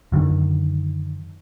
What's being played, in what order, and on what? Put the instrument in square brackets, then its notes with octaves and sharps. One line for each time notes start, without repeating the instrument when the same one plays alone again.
[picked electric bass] F#2 D3 D#3